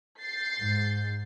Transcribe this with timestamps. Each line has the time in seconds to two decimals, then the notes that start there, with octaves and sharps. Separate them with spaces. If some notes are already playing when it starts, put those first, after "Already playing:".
0.19 G6 A6 C7
0.58 G#2